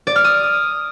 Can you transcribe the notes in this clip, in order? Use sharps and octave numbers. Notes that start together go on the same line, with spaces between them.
D5
F6
D#6